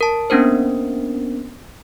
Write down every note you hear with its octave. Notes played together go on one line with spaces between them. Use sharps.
A#4 A5
A#3 B3 C#4 D4 A#4 C5